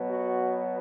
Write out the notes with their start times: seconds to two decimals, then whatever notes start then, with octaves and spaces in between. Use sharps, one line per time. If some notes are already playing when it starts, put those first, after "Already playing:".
Already playing: B2 F#3 B3
0.09 F#4